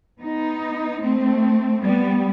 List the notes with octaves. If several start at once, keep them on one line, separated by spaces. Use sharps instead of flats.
B3 D#4
A3 C4
G3 B3